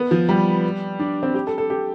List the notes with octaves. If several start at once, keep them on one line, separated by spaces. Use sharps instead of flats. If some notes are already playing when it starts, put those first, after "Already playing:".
Already playing: B3
F3
G3
D4
C4
G4
A4
A4
G4